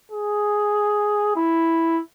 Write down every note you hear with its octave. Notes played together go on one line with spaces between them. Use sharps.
G#4
E4